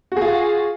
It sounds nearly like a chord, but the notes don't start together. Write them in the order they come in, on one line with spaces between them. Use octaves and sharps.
F#4 G#4 F4